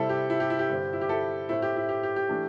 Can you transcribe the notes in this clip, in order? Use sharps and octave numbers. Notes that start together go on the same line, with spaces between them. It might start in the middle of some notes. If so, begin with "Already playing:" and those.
Already playing: C3 G3 C4 E4 A4
G4
E4
G4
E4
G4
G2 D3 C4
E4
G4
E4 A4
A2 A3 C4 E4
G4
E4
G4
G4
G4
E3 A3 D4